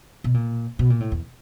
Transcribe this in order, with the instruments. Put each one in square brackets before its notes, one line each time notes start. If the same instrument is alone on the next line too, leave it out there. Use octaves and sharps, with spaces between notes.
[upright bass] B2
A#2
B2
A#2
A2
E2